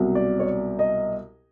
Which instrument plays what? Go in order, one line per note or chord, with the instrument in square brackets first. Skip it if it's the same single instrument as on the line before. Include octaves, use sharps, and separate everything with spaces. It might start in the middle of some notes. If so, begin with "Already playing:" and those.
Already playing: [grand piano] C2 B2 F#3
D5
C#5
D5
D#5